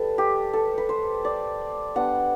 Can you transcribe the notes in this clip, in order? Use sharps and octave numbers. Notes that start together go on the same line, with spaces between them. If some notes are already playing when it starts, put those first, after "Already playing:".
Already playing: G3 A4 B4
G4
A4
B4
C5
D5
G3 B3 D4 F#5